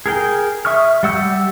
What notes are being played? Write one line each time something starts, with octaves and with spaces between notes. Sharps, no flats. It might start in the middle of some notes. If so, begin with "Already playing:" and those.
G#4 A#4 G5
E5 C#6 D#6 F6
G3 F#5 E6 G6